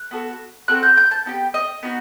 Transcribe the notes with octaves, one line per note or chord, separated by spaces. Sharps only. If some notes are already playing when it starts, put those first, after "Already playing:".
Already playing: F#6
B3 F#4 A4
C4 F#4 A4 F#6
G6
G6
A5
B3 D#4 G4
D#5
B3 D#4 F#4